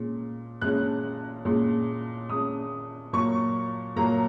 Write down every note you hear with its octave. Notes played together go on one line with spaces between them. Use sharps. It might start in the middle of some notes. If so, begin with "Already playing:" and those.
Already playing: A#2 G#3 C#4
A#2 G#3 C#4 F#6
A#2 G#3 C#4
A#2 G#3 C#4 D#6
A#2 F#3 A#3 C#6
A#2 F#3 A#3 A#5